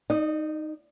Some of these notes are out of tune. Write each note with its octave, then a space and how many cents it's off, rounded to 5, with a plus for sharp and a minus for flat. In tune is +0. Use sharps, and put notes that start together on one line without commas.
D#4 +0 D#5 -45